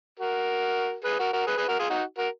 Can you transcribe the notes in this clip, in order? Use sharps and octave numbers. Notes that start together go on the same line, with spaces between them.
F#4 A#4
G#4 B4
F#4 A#4
F#4 A#4
G#4 B4
G#4 B4
F#4 A#4
F4 G#4
D#4 F#4
F#4 A#4